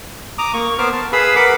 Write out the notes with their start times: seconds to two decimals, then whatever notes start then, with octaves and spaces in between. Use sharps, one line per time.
0.38 A#5 D6 D#6
0.53 A#3 C#6
0.78 B3 A#4 C5 D6 F6
0.93 A#4 A5
1.12 G#4 B4 F5 B5 D#6 E6
1.36 A#4 B4 F#5 B5 D6